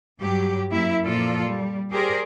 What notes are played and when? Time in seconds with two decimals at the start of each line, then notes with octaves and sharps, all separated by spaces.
0.21 G2 F#3 G4
0.71 F#2 A#3 E4 E5
1.06 A#2 F3 A#3 F4 A4 D5
1.46 G3
1.92 G4 G#4 A#4 C5 D5